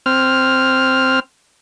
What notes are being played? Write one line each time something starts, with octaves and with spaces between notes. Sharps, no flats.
C4 F6